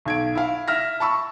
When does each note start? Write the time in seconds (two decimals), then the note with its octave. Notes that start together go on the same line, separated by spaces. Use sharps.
0.06 B1 G#6 D7
0.35 E4 F5
0.68 E5 F6 A#6
1.00 A5 B5 C#6 E6